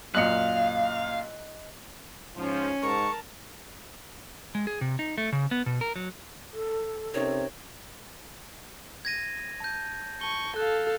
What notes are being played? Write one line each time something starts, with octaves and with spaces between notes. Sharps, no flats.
F#2 A#2 D#5 F5 F#6 C#7
G#2 F3 C#4
G#2 A#4 A5 C#6
G#3
G#4
C3
D#4
A3
C#3
B3
B2
A#4
F#3
A4
C3 C#4 D#4 A#4 C#5
G#6 A#6 D#7
A5 G6
A5 C#6 G7
A4 F5 F#6